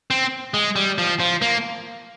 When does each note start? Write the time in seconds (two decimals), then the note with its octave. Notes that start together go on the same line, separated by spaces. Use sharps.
0.10 C4
0.54 G#3
0.76 G3
0.98 F3
1.20 F3
1.42 A#3